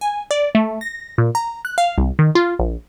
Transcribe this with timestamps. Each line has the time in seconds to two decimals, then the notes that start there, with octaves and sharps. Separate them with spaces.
0.01 G#5
0.31 D5
0.55 A3
0.81 A#6
1.18 A#2
1.35 A#5
1.65 F#6
1.78 F5
1.98 C2
2.19 D#3
2.35 F4
2.59 A#1